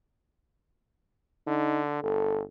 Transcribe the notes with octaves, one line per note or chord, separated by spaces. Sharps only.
D3 D#4
G1 A4